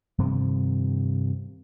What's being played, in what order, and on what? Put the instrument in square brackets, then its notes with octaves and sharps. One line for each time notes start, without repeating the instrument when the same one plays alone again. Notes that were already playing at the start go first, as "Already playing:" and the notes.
[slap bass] G2 C3 D#3 F3